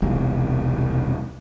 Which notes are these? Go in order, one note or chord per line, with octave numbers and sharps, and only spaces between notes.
E1 C2 G#3